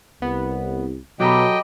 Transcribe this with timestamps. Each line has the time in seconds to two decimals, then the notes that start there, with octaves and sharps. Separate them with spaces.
0.22 C2 B3
1.20 B2 F#3 G4 A4 D#5 G5 A#5 B5